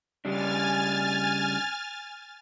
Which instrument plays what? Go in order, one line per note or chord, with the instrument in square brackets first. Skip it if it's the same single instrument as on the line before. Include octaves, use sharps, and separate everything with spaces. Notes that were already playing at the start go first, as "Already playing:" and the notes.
[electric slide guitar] C#3 G3 D4 [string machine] G#5 F6 A6